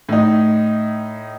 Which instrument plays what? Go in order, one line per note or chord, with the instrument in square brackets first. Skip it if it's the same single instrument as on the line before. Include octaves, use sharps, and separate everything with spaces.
[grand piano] A2 D#4